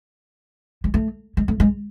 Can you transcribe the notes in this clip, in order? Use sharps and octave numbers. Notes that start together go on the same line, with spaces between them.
G#3
A3
G#3
A3
G#3